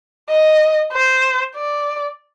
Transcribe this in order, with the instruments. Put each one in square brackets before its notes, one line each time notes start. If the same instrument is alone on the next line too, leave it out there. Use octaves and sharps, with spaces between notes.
[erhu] D#5
C5
D5